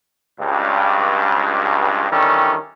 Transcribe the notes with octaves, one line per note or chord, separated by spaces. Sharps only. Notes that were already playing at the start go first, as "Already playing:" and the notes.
C#2 G2
D#3 E3 G3 C#4 D4 A4